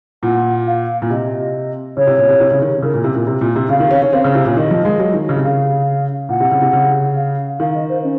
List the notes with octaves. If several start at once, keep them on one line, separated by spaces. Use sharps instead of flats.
A#2 F#5
F5
A#2
C3 D#5
C#3 C#5
C3
A#2
C3
C3
C#3
D#3
C#3 A#4
A#2
C3
A#2
C3
A#2
C3
C#3 F5
D#3
C#4
C#4
C4 F5
C#3
C3
A#2
D#3 D#5
F3
G#3
F#3
D#3
C#3
C3
C#3 F5
A#2 F#5
C3
C#3
C3
C#3
F5
D#3 F5
D#5
C5
C#4